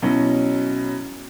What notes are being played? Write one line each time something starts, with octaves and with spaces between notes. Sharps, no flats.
B2 F#3 C#4 E4